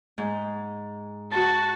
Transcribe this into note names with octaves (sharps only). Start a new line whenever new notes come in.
G#2
F#4 A5